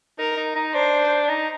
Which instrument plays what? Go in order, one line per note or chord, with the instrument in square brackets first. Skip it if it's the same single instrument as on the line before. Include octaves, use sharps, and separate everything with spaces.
[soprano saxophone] D#4 [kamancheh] A#4
[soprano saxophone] D#4
D#4
[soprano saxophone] D4 [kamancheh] C5
[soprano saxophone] D#4